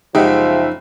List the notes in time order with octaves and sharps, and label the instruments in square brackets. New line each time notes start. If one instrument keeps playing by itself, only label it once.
[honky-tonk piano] F#1 E5 G5 [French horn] F3 [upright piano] G#3 G4 F#5 [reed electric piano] D#4